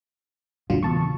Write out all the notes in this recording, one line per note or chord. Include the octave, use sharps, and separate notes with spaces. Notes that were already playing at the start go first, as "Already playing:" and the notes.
F#2 A#2 D3 F#3 F4
E2 A#2 C#3 A5 C#6